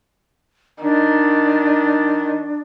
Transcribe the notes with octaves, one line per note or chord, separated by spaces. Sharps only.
D#3 D4